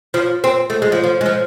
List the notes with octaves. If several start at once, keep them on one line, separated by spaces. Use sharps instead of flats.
F3
C4
A3
G#3
F3
F3
G#3
F3